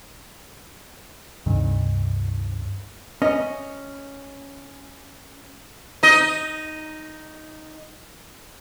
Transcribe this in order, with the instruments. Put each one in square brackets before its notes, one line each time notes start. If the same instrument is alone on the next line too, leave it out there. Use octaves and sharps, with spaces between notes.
[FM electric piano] C#2 G2 C3 D#3
[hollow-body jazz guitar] C#4 [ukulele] D#5
[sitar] D#4 D#5